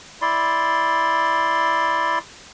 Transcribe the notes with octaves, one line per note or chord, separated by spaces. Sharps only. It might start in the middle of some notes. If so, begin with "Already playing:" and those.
E4 D5 C6